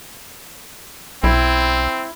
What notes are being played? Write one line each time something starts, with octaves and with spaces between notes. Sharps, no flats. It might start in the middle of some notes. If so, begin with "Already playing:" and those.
B1 C4 E4